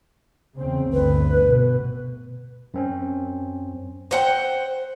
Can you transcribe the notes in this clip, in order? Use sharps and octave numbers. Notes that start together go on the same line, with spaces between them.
E2 C#3 C4
G1 D2 B4
B2
F#2 C4 C#4
C5 F#5 G5